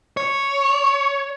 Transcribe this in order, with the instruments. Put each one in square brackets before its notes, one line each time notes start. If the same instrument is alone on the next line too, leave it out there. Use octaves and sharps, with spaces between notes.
[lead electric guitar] C#5